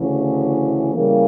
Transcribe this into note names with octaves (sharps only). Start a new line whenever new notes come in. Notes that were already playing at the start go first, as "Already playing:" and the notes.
Already playing: D2 C#3 E3
C#3 E3 G3 A#3